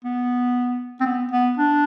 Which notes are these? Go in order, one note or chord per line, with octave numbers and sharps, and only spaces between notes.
B3
C4
B3
B3
D4